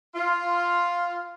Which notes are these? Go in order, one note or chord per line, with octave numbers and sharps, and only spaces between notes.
F4